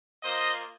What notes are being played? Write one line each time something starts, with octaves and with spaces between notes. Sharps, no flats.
A#3 F4 C5 D#5